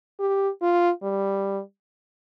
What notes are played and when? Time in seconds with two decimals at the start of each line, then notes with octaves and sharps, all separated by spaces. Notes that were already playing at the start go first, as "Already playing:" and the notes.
0.20 G4
0.61 F4
1.03 G3